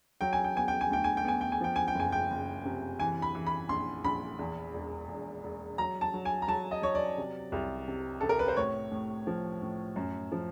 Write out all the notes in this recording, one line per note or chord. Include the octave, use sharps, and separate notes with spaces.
F#3 G5
G#5
G5
B3 G#5
G5
G#5
D2 G5
G#5
G5
B3 G#5
G5
G#5
F3 G5
G#5
G5
F#1 G#5
G5
F#1
C3
E3 G#5
B5
E3
B5
A#1 C6
A#1 B5
E2
E1
E1
E1
F#3 A#5
A5
F#3
G#5
A#5
F#3 A5
D#5
F#3 C#5
D5
C3
C2
C3
C3 A4
A#4
B4
C5
A2 C#5
A2
F3
A2
F#2
F3